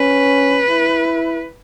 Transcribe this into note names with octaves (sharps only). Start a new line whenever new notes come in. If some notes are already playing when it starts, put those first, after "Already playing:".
Already playing: C#4 B4
E4